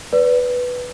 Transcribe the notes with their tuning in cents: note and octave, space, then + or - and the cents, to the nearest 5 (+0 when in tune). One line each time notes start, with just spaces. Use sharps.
B4 +0 D5 -25